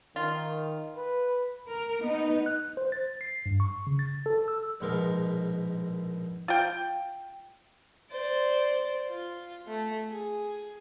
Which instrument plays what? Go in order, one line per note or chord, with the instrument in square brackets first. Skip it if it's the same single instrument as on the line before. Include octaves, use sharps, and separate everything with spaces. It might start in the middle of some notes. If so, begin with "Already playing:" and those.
[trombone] D#3 [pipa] F4
[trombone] B4
[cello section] A#4
B3 D#4
[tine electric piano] F#6
C5
A6
C7
G2
C#6
C#3
A6
A4
E6
[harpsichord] A#1 G#2 B2 A#4
[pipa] F4 G5
[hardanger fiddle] C5 D5
F4
A3
G#4